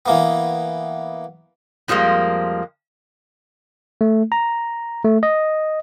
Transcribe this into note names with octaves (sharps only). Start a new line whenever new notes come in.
E3 A#3 B3
F2 F3 G3 G#3 A#3
A3
A#5
A3
D#5